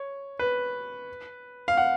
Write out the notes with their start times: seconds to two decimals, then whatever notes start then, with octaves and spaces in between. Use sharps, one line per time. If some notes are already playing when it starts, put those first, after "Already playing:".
Already playing: C#5
0.39 B4
1.68 F5
1.77 F#5